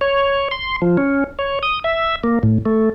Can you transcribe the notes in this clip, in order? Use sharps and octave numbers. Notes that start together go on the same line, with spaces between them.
C#5
C6
F3
C#4
C#5
D#6
E5
A#3
A2
A3